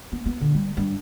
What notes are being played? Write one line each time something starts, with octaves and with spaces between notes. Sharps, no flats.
B3
B3
A#2 D3
G3
G2